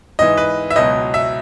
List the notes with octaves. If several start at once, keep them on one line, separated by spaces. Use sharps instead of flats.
G#2 E3 D#5
B4
E5
C#2 B2 F#3 D#5
E5